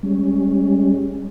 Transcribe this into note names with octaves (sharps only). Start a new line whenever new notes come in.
G3 G#3 C#4